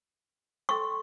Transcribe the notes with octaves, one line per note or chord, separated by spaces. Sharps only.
A4 G5 C6 C#6